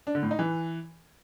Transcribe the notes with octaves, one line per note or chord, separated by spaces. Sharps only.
D4
D3
A2
D#4
E3